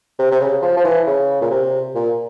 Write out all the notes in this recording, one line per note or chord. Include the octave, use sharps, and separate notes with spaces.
C3
C3
C#3
F3
F3
E3
C#3
A#2
C3
A#2